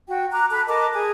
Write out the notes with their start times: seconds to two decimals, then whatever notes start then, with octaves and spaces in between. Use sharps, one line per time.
0.07 F#4 G5
0.32 A#5 D6 F#6
0.51 A4 B5 F#6
0.67 A#4 D#5 A5 D6
0.94 G#4 G#5